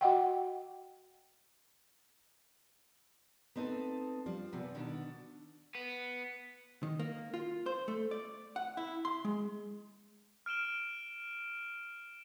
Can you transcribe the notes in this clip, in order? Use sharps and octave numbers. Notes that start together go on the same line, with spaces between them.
F#4 D#5 F#5 G5
A3 B3 C4 D#4 A4 D#5
F3 G3 D4
E2 C3 F3 B3
B2 D3 D#3 B3 D4
B3
D#3
A#3
F4
C5
A3
D5
F#5
E4
C6
G#3
F6 D7 E7 G7